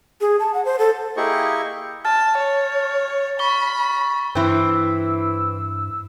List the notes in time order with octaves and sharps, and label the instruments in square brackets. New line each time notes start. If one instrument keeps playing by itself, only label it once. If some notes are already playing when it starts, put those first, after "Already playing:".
[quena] G#4
A5
F#5
C5
A4
[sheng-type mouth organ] A#3 E4 G4 G#4 D#5 C#6
[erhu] A5 [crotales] F6 A6
[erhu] C#5
[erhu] B5 [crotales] C#6 G7
[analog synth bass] G2 [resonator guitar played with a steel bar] E3 C4 [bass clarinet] E4 [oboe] E6